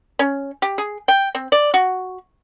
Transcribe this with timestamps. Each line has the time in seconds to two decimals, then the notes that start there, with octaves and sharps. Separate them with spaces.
0.19 C#4
0.62 G4
0.78 G#4
1.08 G5
1.35 C4
1.52 D5
1.74 F#4